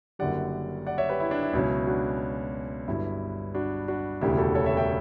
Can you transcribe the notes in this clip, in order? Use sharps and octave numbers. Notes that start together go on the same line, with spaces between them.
F#1 F#2 D3 G3 D5 F#5
D5 F#5
C#5 E5
G4 B4
E4
D4
E4
C#2 B2 F#3 C#4
D4 F#4
G1 G2 F#3 E4
D4 F#4
D4 F#4
E1 D2 C#3 G3 E4 G4
F#4 A4
A4 C#5
C#5 E5
E5 G5